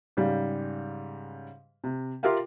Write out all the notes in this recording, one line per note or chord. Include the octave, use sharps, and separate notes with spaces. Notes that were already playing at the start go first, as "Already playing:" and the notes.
G#2 C#3 G3
C3
F4 G4 A#4 E5 F5 G5